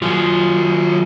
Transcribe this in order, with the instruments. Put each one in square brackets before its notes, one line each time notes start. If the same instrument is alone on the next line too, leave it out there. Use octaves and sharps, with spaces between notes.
[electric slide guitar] D#3 F4 [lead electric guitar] F#3 G#4